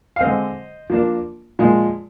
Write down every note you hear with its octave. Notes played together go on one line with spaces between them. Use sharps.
F5
D3 G#3 C4 C5 D#5
F3 A#3 D4
A#2 F3 G#3